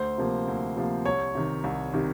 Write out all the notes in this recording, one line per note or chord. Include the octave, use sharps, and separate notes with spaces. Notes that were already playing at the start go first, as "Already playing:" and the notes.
Already playing: D2 C5
C3 F3 A#3
D2
C3 F3 A#3
C2 C#5
C3 D#3
C2
C3 D#3